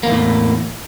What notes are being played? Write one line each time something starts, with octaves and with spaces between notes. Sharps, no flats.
E2 A2 A#3